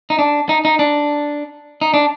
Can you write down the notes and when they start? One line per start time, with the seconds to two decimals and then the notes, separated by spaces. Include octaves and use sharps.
0.10 D#4
0.19 D4
0.49 D#4
0.65 D#4
0.79 D4
1.81 D#4
1.94 D4